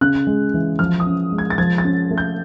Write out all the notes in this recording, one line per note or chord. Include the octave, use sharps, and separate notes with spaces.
C#3 F#6
G#3
E3
F3 F6
D#6
C#4
G#3
G#6
A6
F3 G#6
A6
C#4
A3
G6